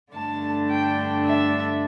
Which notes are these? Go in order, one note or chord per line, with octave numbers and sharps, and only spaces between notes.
G2 D3 A3 D4 A5
G5
E5